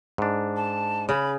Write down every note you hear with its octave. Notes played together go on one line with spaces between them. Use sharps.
G#2 D4
A5
C#3 B5